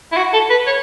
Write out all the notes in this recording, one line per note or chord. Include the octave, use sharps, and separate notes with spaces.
E4
F#4
A4
B4
C#5